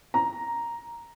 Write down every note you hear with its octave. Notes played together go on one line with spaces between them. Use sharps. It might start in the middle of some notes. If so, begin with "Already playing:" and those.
A#5